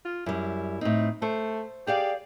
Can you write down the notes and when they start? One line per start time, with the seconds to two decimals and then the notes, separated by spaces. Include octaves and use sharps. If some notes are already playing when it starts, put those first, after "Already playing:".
0.05 F4
0.26 F#2 G3 E4
0.81 A2 C4 D#4
1.22 A3 C5
1.87 G4 G#4 D5 F5